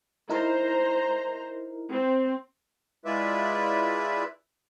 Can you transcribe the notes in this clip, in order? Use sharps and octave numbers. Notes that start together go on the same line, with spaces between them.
D#4 E4 A#4 C5 A#5
C4
G#3 E4 F4 B4 D5 E5